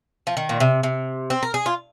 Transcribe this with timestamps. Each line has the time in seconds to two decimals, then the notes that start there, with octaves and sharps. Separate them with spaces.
0.27 F3
0.37 D#3
0.49 A#2
0.60 C3
0.83 C3
1.30 C4
1.43 A#4
1.54 G#4
1.66 F4